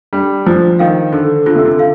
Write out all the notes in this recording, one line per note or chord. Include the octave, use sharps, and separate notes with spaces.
G3 D4
F3 C5
D#3 F5
D3 A4
D3 F4
C3
D3
F5